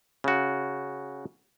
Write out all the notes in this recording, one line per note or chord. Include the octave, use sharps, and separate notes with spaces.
C#3 F#4